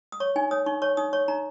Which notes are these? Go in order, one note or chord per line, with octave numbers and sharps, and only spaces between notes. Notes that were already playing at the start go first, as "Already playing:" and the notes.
D#6
C#5 C#6
D#4 G#5
C#5 D#6
D#4 C#6
C#5 C#6
D#4 D#6
C#5 C#6
D#4 A#5